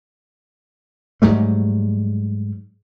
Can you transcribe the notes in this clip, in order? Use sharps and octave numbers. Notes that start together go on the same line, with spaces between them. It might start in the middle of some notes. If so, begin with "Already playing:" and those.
G#2 F#3 G3 A3